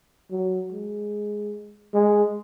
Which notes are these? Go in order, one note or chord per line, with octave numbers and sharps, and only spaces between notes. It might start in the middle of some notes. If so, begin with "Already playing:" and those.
F#3
G#3
G#3